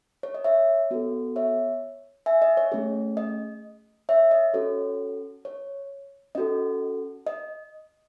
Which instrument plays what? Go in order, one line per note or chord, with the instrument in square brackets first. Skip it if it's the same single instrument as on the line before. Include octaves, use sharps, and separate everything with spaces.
[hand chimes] C#5
D#5
C#5 E5
B3 F#4 A4
C#5 E5
E5 G#5
D#5
C#5
A3 C#4 G#4
D#5
C#5 E5
D#5
C#4 F#4 A4 C#5
C#5
C#4 F#4 A4 D#5
D#5